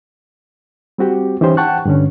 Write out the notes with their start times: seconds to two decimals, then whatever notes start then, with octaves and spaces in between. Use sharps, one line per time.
0.98 G3 C4 F#4 G4
1.41 E3 C#4 D#4 E4 G4 C5
1.57 F#5 G5 A5 C#6 F#6
1.85 G2 D3 C#4